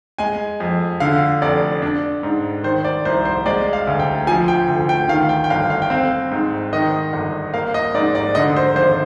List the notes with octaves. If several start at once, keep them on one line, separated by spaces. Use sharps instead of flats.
G#3 G#5
F2
D3 F5
F1 D5
D4
G#2
D#3 C5
D5
C2 C5
C5
G#3 D5
F5
D2
G5
F3 G#5
G5
D2
G5
D#3 F5
G5
G5
G1 F5
F5
G5
C4 F5
G#2
D#3 D#5
G1
A#3 F5
D#5
G#2 D5
D5
D3 D#5
C5
G#1 C5